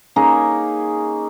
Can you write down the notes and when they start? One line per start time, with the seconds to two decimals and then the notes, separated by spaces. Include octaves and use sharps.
0.16 A#3 C#4 D#4 G#4